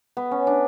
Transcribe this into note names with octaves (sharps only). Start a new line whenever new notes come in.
B3
C#4
D4